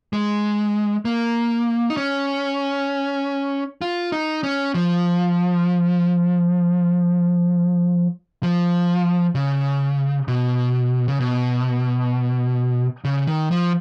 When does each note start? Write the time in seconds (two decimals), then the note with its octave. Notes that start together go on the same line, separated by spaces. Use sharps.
0.13 G#3
1.05 A#3
1.90 D#4
1.97 C#4
3.81 F4
4.12 D#4
4.43 C#4
4.74 F3
8.43 F3
9.35 C#3
10.28 B2
11.08 C#3
11.20 B2
13.05 C#3
13.27 D#3
13.51 F3